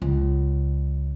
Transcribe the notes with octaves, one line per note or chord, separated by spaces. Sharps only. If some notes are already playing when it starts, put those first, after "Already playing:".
C#2